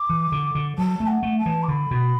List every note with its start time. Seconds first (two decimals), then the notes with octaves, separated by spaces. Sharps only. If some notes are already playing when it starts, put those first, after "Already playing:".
Already playing: D6
0.09 E3
0.32 D3
0.55 D3
0.78 F#3 A5
1.00 A3
1.07 F#5
1.23 A3
1.38 A5
1.46 E3
1.63 D6
1.68 D3 B5
1.91 B2